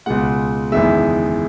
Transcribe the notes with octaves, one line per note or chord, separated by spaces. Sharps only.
C#2 B2 G#3 F#5
F#1 E2 D#3 G#3 E5